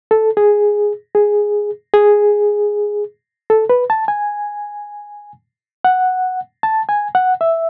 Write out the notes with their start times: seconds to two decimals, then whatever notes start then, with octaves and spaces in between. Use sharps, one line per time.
0.11 A4
0.37 G#4
1.15 G#4
1.94 G#4
3.50 A4
3.69 B4
3.90 A5
4.08 G#5
5.84 F#5
6.63 A5
6.89 G#5
7.15 F#5
7.41 E5